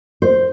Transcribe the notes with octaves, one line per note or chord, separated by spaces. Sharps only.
C5